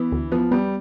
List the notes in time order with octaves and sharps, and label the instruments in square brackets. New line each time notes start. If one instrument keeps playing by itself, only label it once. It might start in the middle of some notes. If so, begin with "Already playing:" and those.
Already playing: [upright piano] E3 [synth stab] B3
[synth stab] D2
[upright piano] F3 [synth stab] B3
[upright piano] G3 [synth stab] B3